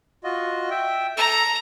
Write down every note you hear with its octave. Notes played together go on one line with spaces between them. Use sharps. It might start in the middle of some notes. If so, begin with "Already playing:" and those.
F4 F#4 D#5
E5 G5
A4 A#5